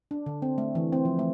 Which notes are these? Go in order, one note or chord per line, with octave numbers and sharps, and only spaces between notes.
D4
D3
C4
A3
E3
C4
F3
A3